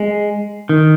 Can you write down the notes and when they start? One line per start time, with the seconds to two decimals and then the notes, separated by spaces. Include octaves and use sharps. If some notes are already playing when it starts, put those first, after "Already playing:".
Already playing: G#3
0.69 D#3